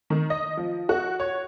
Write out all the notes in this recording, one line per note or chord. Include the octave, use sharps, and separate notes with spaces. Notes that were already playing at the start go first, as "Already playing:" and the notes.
D#3
D#5
F3
F#4
C#5